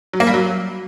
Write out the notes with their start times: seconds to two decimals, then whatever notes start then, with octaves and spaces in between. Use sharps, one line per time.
0.13 F#3
0.20 A#3
0.27 G3
0.34 F#3